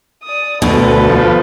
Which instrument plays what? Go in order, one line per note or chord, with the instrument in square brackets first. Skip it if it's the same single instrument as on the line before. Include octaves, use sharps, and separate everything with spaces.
[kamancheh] D5 D#6
[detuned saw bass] D2 [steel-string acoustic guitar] B2 [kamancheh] A4 B4
[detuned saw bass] F3